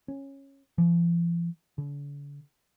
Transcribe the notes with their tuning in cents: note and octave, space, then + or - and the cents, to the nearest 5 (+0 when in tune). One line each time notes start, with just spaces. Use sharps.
C#4 -15
F3 -45
D3 -45